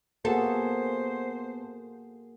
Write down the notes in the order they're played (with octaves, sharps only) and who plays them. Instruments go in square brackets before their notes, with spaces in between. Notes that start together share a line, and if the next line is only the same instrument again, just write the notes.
[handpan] A#3 F#4 G#4 [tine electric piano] B3 A5 [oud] A4 [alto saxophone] C5